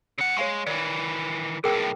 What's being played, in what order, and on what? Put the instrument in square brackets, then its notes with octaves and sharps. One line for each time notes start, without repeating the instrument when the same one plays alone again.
[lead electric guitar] C#3 F#5
[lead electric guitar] G#3 [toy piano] C#5 F5 C#6
[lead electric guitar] D#3 E3 [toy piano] D5
[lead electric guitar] B1 A2 [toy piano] G#4 A#4 G5